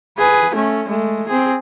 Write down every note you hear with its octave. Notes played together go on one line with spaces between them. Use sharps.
G#4 B4
A3 C#4
G#3 A3
C4 G#4